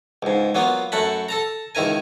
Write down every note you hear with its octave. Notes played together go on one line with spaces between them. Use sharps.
C#2 G#2
F#3 A#3 B3 F4
F#2 A3 F#5 A5 B5
A4 A5 A#5
C#2 D#3 E4 A#4 G#5